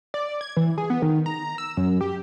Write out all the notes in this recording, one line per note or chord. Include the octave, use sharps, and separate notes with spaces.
D5
G#6
E3
G#4
B3
D#3
A#5
E6
F#2
G4